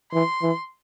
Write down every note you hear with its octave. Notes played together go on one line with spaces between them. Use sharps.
E3 C6
E3